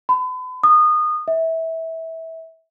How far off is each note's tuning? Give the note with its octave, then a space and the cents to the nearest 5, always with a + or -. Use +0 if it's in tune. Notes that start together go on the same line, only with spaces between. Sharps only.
B5 +40
D#6 -25
E5 -20